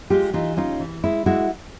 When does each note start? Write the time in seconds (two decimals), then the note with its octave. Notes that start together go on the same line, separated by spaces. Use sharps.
0.10 G#3 F4 G4
0.33 E3 D#4 F4
0.57 C#4 D#4 F4
0.80 E3
1.03 G#3 E4
1.26 G#3 E4 F#4